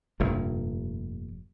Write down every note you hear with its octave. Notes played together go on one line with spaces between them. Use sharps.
F1 G2 A#2